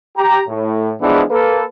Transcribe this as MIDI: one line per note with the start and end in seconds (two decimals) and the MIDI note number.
0.17 0.41 67
0.17 0.41 82
0.48 0.93 45
1.01 1.22 52
1.01 1.22 53
1.01 1.22 56
1.01 1.22 59
1.01 1.22 62
1.01 1.22 68
1.31 1.63 58
1.31 1.63 69
1.31 1.63 71